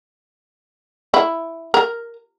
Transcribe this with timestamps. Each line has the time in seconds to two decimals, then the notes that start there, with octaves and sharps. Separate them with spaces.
1.14 E4
1.74 A#4